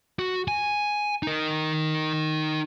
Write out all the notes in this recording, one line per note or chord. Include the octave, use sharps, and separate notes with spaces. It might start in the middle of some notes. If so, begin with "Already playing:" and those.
F#4
G#5
D#4 A#4